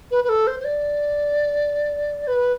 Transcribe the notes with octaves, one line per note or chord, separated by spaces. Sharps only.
B4
B4
A4
C5
C5
D5
B4